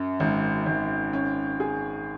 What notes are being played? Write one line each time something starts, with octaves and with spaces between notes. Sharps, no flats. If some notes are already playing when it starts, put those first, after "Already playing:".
Already playing: F#2
G#1
G#1
C#4
G#4